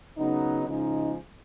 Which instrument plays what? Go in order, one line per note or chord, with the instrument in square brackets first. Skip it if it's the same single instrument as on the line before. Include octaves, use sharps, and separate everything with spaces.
[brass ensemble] C#3 F#3 B3 D#4
C#3 F3 G#3 D#4